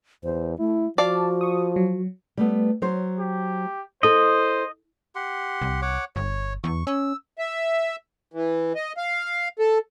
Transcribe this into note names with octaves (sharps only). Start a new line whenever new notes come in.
E2 C5
A3 E4
F3 F#4 D5 F5 A5
C#6 D#6
F#3
G3 A3 B3
F#3 C5
G4
E4 A4 C5 D#5
G4 F#5 C6
C2
C#5 F#5 D6
G1 C#5
E2 C#6
C#4 E6
E5
E3
D#5
F5
A4